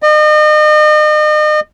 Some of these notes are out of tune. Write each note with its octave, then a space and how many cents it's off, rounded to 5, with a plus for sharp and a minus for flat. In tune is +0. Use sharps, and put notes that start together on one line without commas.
D#5 -40